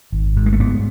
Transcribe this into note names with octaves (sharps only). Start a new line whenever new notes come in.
G#1
G#2
G#3
A3
G#2 B3